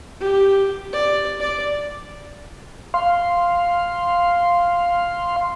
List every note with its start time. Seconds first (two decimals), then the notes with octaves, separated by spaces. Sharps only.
0.20 G4
0.93 D5
1.40 D5
2.94 F5 C6